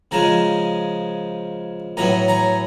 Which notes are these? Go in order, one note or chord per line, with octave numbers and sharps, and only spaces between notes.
C#3 F3 G#3 G#5 A#5
A2 F#3 B3 G#5 A#5
G#5 A#5